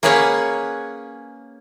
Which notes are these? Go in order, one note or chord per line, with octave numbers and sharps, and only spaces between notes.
A#3 C#4 G#4 B4 C#5 F#5